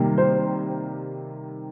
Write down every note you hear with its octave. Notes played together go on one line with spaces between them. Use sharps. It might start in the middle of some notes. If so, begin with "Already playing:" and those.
Already playing: C3 D#3 G3 A#3
C5